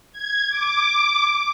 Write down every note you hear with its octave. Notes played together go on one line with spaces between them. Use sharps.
G#6
D6